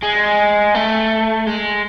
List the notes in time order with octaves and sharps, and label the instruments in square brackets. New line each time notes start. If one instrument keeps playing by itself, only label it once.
[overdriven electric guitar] G#3
A3
G#3